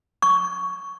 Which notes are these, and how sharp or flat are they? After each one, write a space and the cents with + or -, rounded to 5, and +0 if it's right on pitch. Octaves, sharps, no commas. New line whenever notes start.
C#6 +10